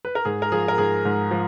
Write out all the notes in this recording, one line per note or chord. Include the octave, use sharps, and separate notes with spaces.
B4
A#4
G#2 G#4
A#4
F3 G#4
A#4
G#2 G#4
G#2
F3